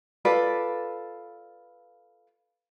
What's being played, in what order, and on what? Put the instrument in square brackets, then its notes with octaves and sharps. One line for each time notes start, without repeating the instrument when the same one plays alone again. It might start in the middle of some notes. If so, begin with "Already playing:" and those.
[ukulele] F4 A4 B4 D5